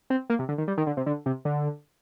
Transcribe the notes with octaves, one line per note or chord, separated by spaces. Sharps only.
C4
A#3
C3
D3
D#3
G3
D#3
D3
C3
D3
C3
D3